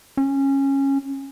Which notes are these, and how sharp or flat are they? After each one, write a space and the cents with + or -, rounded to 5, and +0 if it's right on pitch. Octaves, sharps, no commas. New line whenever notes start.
C#4 -15